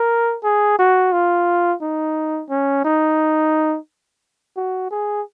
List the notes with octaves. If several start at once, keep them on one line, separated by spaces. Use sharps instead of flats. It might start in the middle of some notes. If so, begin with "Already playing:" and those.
Already playing: A#4
G#4
F#4
F4
D#4
C#4
D#4
F#4
G#4